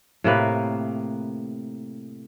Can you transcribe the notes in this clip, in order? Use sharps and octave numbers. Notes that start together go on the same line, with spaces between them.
A2 C3 A#3 B4